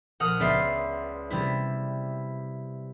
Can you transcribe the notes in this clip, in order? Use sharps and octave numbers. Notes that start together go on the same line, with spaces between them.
A#1 D#5 F#5 D#6 F6
C#2 B3 D5 E5 C6 C7
C3 G3 E4